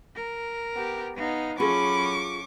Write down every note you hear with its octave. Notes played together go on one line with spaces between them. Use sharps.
A#4
B3 G4
B3 D#4 F5
F#3 C#4 F4 G#4 A4 B5 C#6 D6